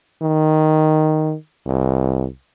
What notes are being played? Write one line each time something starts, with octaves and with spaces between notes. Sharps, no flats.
D#3
C2